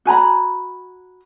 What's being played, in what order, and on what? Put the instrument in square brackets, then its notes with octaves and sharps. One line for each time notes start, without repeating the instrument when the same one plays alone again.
[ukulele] F#4 G#5 A#5 B5